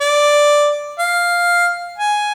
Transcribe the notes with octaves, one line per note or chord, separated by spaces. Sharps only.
D5
F5
G#5